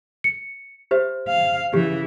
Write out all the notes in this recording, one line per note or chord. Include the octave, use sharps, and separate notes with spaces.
C#7
G4 C5 E5
F5
C#3 E3 G4